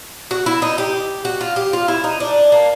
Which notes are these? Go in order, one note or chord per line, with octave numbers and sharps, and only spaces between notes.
F#4
E4
D#4
G4
F#4
F4
G4
F4
E4
D#4
D4
A#3